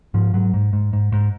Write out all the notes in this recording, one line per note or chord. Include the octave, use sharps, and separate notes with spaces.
G#2 F3
G#2 F#3
G#2
G#2
G#2
G#2